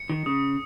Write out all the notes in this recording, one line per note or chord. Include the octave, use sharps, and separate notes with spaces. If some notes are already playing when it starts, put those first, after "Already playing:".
Already playing: C#7
D#3
C#3 D#6